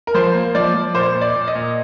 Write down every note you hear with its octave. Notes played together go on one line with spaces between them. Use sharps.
A#4
F3 C5
A#3
F3 D5
F3
A#2 C5
A#2
D5
A#2
D#5
A#2